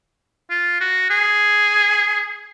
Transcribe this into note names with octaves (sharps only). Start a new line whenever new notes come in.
F4
F#4
G#4